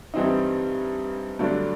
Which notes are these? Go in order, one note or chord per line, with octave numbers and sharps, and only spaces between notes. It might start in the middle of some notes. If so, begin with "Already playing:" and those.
G2 E3 G3 C4 D#4
G2 D3 F#3 A3 D4